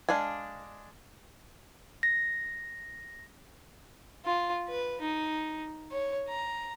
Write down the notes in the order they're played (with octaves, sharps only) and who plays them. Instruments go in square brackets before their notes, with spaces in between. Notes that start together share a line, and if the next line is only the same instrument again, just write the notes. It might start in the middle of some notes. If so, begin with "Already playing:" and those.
[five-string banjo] G#3 D4 F5 G#5
[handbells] A#6
[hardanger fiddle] F4
B4
D#4
C#5
A#5